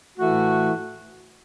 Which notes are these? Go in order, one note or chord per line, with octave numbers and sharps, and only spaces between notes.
A2 E3 A3 F#4